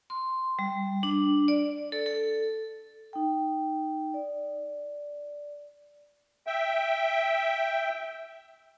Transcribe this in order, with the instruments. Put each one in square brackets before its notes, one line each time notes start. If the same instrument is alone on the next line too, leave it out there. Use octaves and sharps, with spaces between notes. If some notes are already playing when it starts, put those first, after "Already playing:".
[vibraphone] C6
G3
D4
D5
A4
A4
D#4 G5
D5
[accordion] E5 G5